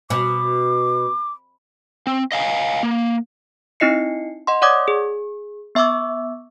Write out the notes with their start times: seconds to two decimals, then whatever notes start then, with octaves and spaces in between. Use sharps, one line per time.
0.10 B2 D6
2.07 C4
2.32 D#5 F5 G#5
2.83 A#3
3.80 C4 D#4 E4 D#5 C7 C#7
4.47 D#5 F#5 C6
4.62 C#5 D5 F#5 D6 D#6 G#6
4.88 G#4
5.75 B3 E5 C#6 D6 E6